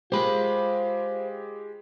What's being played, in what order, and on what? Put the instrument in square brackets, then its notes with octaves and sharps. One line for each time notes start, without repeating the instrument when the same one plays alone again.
[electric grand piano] G#3 G4 [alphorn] F4 [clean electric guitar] C5 B5